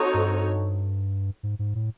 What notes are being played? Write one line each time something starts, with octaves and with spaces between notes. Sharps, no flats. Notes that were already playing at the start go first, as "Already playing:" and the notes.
Already playing: C4 D#4 F#4 A4 C#5
G2
G#2
G#2
A2